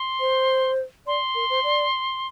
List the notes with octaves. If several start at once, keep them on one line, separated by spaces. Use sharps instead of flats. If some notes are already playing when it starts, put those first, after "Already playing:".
Already playing: C6
C5
D5 C6
A#4
C5
D5